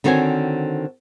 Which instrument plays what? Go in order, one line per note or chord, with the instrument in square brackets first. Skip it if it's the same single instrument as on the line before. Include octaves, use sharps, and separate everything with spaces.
[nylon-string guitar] D3 D#3 C4 F#4 C#5 G#5